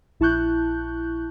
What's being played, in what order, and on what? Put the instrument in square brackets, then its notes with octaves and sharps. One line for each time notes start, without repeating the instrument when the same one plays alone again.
[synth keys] A#1 E4 A5 C#6 F#6 G6